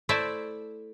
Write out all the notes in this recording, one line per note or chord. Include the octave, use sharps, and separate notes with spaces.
A3 E4 C5 D5 E5